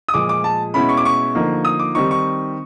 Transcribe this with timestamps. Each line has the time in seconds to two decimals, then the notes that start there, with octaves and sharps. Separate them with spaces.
0.09 D#6
0.14 A#2 F3 G#3 D6
0.29 D6
0.44 A5
0.74 B2 G#3 C#4 E4 B5
0.89 C#6
0.97 D6
1.05 C#6
1.35 D3 F3 A#3 D#4
1.65 D#6
1.79 D6
1.95 D#3 G3 C4 D#4 C#6
2.11 C#6